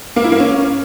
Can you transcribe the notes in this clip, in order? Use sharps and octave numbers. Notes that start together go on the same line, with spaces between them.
A#3
E4
A#3
C#4